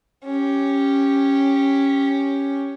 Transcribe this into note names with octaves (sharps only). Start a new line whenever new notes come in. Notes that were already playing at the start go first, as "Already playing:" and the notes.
C#4 G4